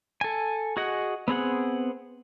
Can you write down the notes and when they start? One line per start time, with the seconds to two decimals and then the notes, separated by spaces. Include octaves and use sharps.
0.21 A4 G#5
0.77 F#4 G#4 D#5 F#5
1.28 B3 C4 G#4 F#5